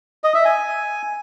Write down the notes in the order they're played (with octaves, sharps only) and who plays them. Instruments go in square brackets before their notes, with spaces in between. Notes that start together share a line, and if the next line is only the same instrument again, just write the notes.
[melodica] D#5
E5
G#5